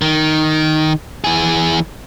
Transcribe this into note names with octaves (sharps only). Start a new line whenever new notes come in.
D#3
E3 G#4